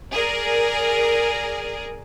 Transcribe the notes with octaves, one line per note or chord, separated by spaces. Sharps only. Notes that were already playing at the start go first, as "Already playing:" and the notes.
G#4 A#4 D5